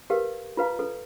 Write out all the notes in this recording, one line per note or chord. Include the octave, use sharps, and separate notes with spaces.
G4 A#4 B4 F5
F4 B4 F5 A#5
A4 B4